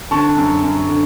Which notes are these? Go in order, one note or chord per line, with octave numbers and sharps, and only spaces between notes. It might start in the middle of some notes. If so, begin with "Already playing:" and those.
D3 A5 C#6
F#2
F#2
D3